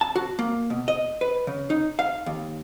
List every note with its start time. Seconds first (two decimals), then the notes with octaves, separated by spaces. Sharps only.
0.01 A5
0.16 F#4
0.39 A#3
0.70 B2
0.88 D#5
1.21 B4
1.47 C#3
1.70 D#4
1.99 F5
2.26 D#2